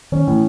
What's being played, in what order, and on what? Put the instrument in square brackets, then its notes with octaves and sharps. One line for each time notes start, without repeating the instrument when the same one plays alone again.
[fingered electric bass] D#3 [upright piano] C#4
[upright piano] A2 [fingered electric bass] E3